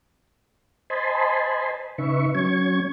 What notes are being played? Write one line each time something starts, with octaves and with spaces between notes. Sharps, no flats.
C5 D#5 G#5 A5 B5 C6
C#3 D#4 B4 E5 C#6
F#3 C#4 C#6 G#6